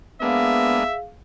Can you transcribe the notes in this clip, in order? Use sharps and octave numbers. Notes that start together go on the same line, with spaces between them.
G#3 A#3 B3 D4 G#4 E5 F5